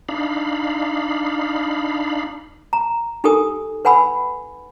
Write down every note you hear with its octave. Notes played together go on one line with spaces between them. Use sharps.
D4 D#4 F5 B5
A#5
D#4 G4 A4 A#4 G#5 D#6
B4 F#5 G#5 B5 E6